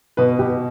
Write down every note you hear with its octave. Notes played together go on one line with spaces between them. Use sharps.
B2 B4
B2 G4